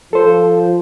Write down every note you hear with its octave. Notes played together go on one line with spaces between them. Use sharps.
F3 A4 C5